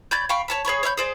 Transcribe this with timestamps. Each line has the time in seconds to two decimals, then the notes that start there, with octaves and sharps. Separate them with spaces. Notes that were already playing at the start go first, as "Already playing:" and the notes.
0.11 C#5 D5 B5 G6
0.29 F5 G5 B5 C#6
0.48 C#5 A5 B5
0.65 G#4 C#5 B5 C#6
0.83 C#5 E5 B5 G6
0.97 G#4 C5 D5